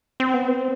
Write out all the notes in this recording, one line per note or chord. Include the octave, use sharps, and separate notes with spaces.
C4
B3
C4